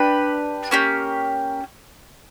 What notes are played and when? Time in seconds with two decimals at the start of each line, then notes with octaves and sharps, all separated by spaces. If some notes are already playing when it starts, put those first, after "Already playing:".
Already playing: D4 G4 B4
0.71 A#3 C#4 G4